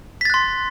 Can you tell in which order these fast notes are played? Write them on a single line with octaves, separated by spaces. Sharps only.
B6 A6 F#6 C6